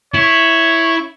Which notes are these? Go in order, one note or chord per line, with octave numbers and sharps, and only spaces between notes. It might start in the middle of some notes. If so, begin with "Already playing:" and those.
E4 C#5